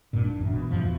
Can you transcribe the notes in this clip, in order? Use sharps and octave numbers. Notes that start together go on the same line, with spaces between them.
E1 G2 A#2
D4
A1 F#2
B2
G2 E3 F3
E2 B2